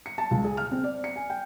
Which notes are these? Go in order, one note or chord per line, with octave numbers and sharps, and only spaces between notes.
C#7
A5
C#2
G#4
F6
C4
D5
C#7
G#5
G5